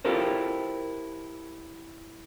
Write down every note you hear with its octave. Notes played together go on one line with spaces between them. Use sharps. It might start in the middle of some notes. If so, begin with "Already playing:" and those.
E4 F4 G4 A4 A#4 C5